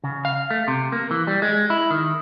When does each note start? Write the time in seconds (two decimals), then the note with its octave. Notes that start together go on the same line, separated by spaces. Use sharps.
0.04 C#3
0.25 F5
0.51 A3
0.68 C3
0.92 A#3
1.11 E3
1.27 G3
1.42 G#3
1.70 E4
1.91 D#3